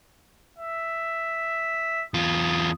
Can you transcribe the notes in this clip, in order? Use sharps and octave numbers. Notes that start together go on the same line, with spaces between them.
E5
E2 F4 D#6